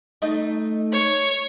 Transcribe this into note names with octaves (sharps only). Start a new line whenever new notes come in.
A3 D#4 D#5
C#5